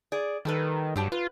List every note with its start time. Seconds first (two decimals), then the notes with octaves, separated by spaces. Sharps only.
0.12 G#4 D5
0.45 D#3 G3 A4 B4
0.96 G2 F#3 G4 A5
1.12 F4 B4